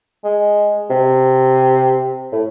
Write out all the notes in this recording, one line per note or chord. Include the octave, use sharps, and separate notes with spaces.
G#3
C3
A2